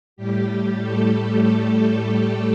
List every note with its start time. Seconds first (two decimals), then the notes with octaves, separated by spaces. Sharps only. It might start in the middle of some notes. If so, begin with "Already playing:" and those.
0.16 A2 G3 G4
0.79 A3 A4
1.11 G3 G4